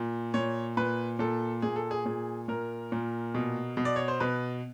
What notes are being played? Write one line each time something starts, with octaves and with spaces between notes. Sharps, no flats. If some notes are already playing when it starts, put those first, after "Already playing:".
Already playing: A#2
A#2 C#5
A#2 B4
A#2 A4
A#2 G#4
A4
G#4
A#2 G#4
A#2 A#4
A#2
B2
B2
D5
C#5
C5
B2 B4